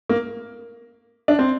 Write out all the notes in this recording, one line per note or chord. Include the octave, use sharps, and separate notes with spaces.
A#3
D4
C4